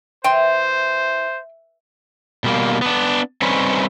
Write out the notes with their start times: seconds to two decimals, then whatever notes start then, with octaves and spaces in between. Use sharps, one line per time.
0.24 E3 C5 G5 C6
2.44 B2 G3 A#3
2.82 B3 D4
3.42 G3 C4 C#4 D#4 B4 C#5